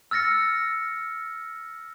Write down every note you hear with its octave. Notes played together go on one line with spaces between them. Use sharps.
E6 F6 A6 A#6 C#7